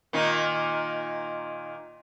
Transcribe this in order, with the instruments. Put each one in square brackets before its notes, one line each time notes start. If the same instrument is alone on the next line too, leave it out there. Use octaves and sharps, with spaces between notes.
[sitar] A#2 D#3 D#4